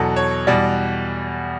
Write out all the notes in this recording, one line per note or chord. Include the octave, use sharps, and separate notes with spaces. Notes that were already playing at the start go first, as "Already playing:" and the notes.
Already playing: E2 B2 F#3 A4
C#5
E2 B2 G3 D5